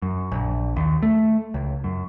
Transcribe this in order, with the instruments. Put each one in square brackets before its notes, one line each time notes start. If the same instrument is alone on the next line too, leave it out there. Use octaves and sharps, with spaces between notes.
[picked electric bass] F#2
A#1
D#2
A3
C#2
F#2